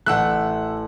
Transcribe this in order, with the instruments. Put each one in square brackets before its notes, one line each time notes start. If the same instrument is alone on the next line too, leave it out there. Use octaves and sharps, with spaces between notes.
[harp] A1 A3 [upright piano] F#5 E6 F#6